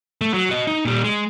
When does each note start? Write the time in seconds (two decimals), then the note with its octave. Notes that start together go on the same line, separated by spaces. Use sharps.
0.21 A3
0.34 F#3
0.50 F#4 D#5
0.67 D#4
0.85 A#2 G3
1.04 G#3